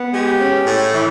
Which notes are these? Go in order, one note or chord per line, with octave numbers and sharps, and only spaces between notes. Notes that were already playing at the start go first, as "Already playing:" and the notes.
Already playing: B3
G#3 G4
C#4
A2
E3